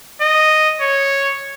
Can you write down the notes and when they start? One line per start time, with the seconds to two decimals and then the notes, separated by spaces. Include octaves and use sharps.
0.21 D#5
0.81 C#5